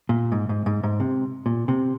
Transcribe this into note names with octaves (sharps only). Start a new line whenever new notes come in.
A#2
G#2
G#2
G#2
G#2
C3
A#2
C3